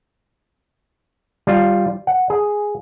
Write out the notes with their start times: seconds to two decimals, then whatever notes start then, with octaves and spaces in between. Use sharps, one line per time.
1.47 G3 F4
2.07 F#5
2.30 G#4